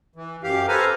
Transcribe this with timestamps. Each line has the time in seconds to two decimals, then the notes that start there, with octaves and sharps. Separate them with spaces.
0.16 E3
0.43 F#2 G4 F5
0.68 A4 B4 C5 F5 G#5 A#5